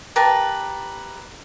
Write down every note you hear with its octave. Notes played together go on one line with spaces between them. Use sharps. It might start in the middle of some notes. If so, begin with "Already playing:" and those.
G4 A#4 B4 A5